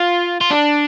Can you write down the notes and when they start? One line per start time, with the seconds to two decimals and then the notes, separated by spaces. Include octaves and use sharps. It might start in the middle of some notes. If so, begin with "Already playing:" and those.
Already playing: F4
0.41 F4
0.50 D4